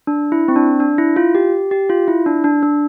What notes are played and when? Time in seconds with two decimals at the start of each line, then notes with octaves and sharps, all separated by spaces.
0.07 D4
0.32 E4
0.48 C4
0.56 D4
0.80 D4
0.98 E4
1.16 F4
1.35 G4
1.71 G4
1.90 F4
2.08 E4
2.26 D4
2.44 D4
2.63 D4